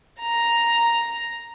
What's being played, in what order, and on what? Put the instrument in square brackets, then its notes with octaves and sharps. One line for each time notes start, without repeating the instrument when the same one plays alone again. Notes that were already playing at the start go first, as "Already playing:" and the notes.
[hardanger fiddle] A#5